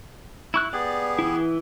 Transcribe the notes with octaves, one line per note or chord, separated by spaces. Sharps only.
E4 C#6 F#6
B3 G4 G#4 D5
E3 E4